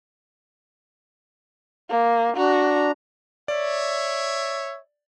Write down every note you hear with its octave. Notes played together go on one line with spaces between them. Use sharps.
A#3
D4 F#4 A#5
C#5 D5 E5